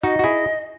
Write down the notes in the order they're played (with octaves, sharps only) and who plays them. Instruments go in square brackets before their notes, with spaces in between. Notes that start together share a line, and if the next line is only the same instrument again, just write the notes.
[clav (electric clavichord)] D#4 F#4 [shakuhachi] D#5
[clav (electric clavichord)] F#4
E4 G#4